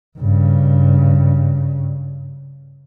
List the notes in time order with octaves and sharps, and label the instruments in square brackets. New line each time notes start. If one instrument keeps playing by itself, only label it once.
[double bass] G2 C#3